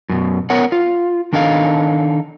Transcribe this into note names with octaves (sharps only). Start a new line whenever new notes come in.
F#2 B2
B3 A#4 C#5 F#5
F4
D#3 D4 D#4 A4 F5